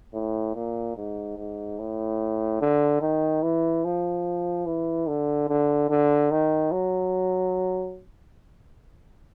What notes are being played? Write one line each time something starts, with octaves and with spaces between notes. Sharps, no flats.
A2
A#2
G#2
G#2
A2
D3
D#3
E3
F3
E3
D3
D3
D3
D#3
F#3